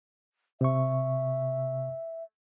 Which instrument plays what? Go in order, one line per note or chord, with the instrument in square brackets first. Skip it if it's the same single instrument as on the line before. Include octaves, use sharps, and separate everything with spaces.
[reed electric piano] C3 C#6 [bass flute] E5